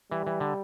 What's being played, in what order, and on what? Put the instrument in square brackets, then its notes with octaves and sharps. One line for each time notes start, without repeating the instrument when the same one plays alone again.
[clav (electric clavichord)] E3 [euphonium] G3
[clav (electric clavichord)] E3
D3